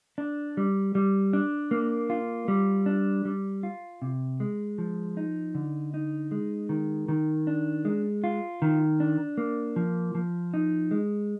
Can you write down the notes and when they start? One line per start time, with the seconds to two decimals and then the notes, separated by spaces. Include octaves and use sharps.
0.18 D4
0.57 G3
0.95 G3
1.33 D4
1.71 A#3
2.10 F4
2.48 G3
2.86 D4
3.25 G3
3.63 F4
4.02 C3
4.40 G#3
4.78 F3
5.17 D#4
5.55 D3
5.94 D#4
6.31 G#3
6.69 D#3
7.09 D#3
7.47 D4
7.85 G#3
8.24 F4
8.62 D#3
9.00 D4
9.38 A#3
9.76 F3
10.15 F3
10.54 D#4
10.91 G#3